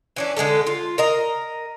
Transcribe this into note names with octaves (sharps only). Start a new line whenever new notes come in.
E3 C#4 D4
D3 G#3 A3 A4
F4
A#4 D#5 A#5